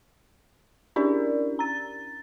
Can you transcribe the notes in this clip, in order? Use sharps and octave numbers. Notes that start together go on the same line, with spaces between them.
C#4 D4 E4 G4 A#4 D5
A#5 A6